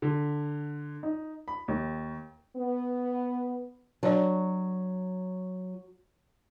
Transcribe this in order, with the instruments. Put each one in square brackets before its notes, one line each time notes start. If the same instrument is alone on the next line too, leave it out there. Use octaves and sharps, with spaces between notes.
[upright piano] D3
D#4
B5
D#2
[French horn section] B3
[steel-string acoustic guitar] F#3 [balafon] D4 D5